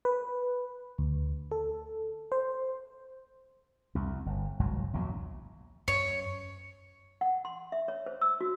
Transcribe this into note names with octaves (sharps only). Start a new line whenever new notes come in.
B4
D2
A4
C5
C2 F2
G1
G1 C2 G#2 F#3
A#1 E2 A#2 F#3
F#2 C#5
F#5
C6
E5
C#5
C5
E6
F#4